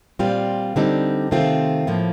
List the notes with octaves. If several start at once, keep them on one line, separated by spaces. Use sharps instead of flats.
A#2 G3 C4 F4
D3 G3 C4 D#4
C3 D#3 A3 C4 F4
A2 F3 A#3